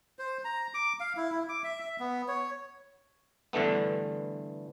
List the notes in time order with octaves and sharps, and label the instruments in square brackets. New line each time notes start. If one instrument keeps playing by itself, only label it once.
[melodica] C5
A#5
D6
F5
E4
E4
D6
E5
E5
B3
C#5
[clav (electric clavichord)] G2 D3 E3 A3 B3